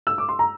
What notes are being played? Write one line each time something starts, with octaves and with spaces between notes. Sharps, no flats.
E6
D6
C6
A#5